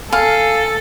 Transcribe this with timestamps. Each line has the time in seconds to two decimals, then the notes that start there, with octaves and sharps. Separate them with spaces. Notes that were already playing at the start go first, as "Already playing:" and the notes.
0.13 A4 F5 G#5